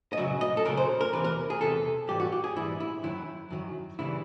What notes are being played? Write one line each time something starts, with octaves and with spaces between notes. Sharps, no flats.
D#5
F#2 C#3 F#3 E5
D#5
A4
F#2 C#3 F#3 A#4
C5
A#4
E2 C3 E3 B4
A#4
G#4
E2 C3 E3 A4
G#2 E3 G3 G4
F#4
G4
G#4
G#2 E3 G3 E4
E4
F#2 D#3 F#3 E4
F#2 D#3 F#3
C#3 E3 G3 E4